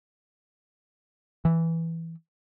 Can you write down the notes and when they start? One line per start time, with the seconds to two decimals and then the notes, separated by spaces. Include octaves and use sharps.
1.45 E3